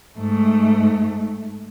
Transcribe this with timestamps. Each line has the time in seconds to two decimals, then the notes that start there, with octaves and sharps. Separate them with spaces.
0.18 G#2 A3